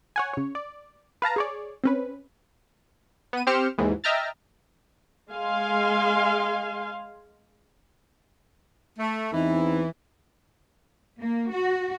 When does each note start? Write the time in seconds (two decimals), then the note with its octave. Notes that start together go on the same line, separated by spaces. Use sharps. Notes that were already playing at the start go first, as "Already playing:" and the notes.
0.16 C#5 F#5 G#5
0.34 C#3 C#5
0.55 D5
1.22 B4 F5 A5 A#5
1.36 G#4 C#5 D5
1.84 C4 C#4 B4
3.33 B3 D#7
3.47 C4 G4 C5 F6 C#7 E7
3.78 D#2 G#2 E3
4.04 D#5 E5 G5 A#5 F6 A6
5.30 G#3 F5 G#5 C6
8.98 A3
9.32 E2 E3 C4 D#4
11.20 A#3
11.53 F#4